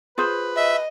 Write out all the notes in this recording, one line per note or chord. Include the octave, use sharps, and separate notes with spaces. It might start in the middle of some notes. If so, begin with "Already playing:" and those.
F4 G#4 B4 C5
D#5 E5